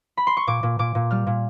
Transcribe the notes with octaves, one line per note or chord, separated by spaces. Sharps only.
B5
C6
C#6
A#2 D6
A#2
A#2 D6
A#2
G3 F6
A#2